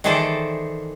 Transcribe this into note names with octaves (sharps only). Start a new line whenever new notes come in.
D#3 E3 G#4 A4 C5 D5